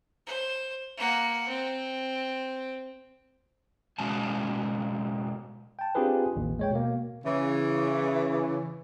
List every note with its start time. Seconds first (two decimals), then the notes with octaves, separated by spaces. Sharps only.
0.27 C5
0.97 A#3 F#5
1.49 C4
3.98 B2 G#3 C#4 F#4 G#5 A5
5.79 G5 A5
5.95 C4 D4 F4 G4 G#4 B4
6.36 A1 D#2
6.59 G#3 C#5 G5
6.71 B2 A#3
7.25 C#3 E3